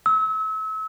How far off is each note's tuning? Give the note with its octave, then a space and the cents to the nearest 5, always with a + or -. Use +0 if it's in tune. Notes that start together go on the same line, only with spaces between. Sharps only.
E6 -35